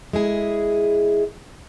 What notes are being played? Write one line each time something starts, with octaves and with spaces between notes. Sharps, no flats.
G#3 E4 G#4